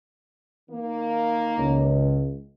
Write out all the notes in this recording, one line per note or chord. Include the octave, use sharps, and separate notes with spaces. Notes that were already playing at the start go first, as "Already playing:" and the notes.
D#3 A#3
C#2